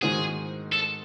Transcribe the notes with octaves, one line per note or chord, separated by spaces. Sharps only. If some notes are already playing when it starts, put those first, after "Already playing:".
G#2 D#3 G#3 C4 F#4 G#4
A4